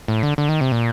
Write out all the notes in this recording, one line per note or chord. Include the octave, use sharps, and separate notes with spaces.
A2
D3
D3
D#3
C3
A#2